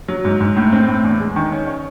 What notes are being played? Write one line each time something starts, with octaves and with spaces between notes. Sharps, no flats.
F#3
G#2
G#2
A2
C4
A2
E2
G#3
D#3
C#4
C#5